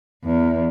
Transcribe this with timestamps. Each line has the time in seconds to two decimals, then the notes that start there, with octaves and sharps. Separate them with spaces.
0.24 E2